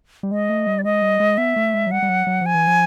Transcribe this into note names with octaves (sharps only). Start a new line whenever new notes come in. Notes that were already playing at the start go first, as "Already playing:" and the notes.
G3
G#3 D#5
A3
G3
D5
G#3 D#5
G3
G#3
B3 E5
A3
G#3
F#3
G3 F#5
G3
F#3
F#3
F3 G#5
E3
F3